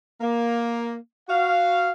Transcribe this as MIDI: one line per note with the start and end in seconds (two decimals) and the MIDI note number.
0.21 0.95 58
1.28 1.90 66
1.28 1.90 77